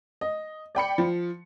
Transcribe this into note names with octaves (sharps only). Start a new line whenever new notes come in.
D#5
D5 G5 B5 C#7
F3